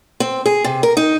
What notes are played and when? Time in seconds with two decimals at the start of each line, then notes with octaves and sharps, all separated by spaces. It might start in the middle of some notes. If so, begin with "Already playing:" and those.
0.20 C4
0.46 G#4
0.64 C3
0.83 A#4
0.97 D#4